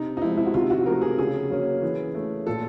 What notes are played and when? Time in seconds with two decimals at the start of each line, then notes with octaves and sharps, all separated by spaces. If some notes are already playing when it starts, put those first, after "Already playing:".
Already playing: C3 D#4
0.17 D#4
0.22 F3 G#3 C4 E4
0.37 E4
0.46 F#4
0.54 C3 F4
0.70 F#4
0.86 F3 A3 A#4
1.02 G#4
1.18 C#3 G#4
1.50 F#3 A#3 C#4
1.82 E3
2.15 A3 C#4
2.47 A#2 A4